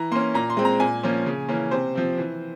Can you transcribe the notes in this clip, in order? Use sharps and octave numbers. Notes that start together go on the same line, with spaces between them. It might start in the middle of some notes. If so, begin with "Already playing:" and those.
Already playing: E3 A#5
A#3 C#4 C6
A#2 A#5
C6
G#3 C4
A#5
A#2 G#5
F3 A#3 C#4
C#3
E3 A#3 C#4
C3 C5
F3 C4
E3